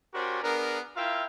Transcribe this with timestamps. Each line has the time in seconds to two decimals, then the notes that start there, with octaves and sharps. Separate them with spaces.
0.14 C#4 F#4 G4 A#4 C5 D5
0.43 B3 D4 G#4 A#4
0.96 E4 F4 A#4 E5 F5 G5